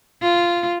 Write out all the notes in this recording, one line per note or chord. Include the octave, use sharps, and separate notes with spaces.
F4